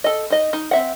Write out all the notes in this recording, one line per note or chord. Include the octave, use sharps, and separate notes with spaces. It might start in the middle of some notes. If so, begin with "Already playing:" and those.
A4 D#5
D#4 D#5
D#4
C4 E5 F#5